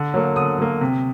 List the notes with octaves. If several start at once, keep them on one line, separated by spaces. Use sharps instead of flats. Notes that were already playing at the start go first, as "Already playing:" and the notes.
Already playing: D3
F#3 A#3
D3 D#6
F#3 A#3
C3